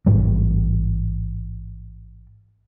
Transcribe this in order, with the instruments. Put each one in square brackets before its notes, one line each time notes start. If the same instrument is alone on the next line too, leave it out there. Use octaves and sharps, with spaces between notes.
[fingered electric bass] A1 G#2 G3